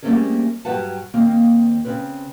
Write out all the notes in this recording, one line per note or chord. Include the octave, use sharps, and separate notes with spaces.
G3 A3 A#3 C4 C#4 G#4
G2 F#3 G4 B4 F#5 A5
D#2 A#3 C4
C#3 C4 B4